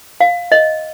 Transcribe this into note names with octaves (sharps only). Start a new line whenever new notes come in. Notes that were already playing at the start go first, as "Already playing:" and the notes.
F5
D#5